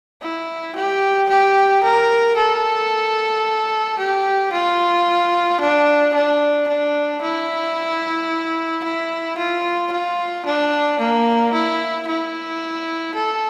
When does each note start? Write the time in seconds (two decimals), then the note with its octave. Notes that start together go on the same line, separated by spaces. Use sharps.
0.22 E4
0.75 G4
1.29 G4
1.83 A#4
2.37 A4
3.98 G4
4.53 F4
5.61 D4
6.14 D4
6.68 D4
7.22 E4
8.84 E4
9.38 F4
9.92 F4
10.46 D4
11.00 A#3
11.53 E4
12.07 E4
13.15 A4